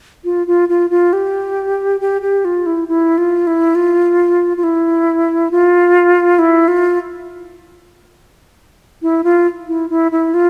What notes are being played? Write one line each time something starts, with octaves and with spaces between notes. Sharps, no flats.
F4
F4
F4
F4
G4
G4
G4
F4
E4
E4
F4
E4
F4
F4
E4
F4
E4
F4
E4
F4
E4
E4
E4
F4